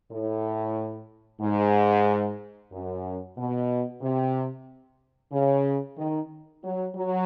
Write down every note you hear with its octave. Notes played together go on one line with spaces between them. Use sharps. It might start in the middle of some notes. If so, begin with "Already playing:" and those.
A2
G#2
F#2
B2
C3
C#3
D#3
F#3
F#3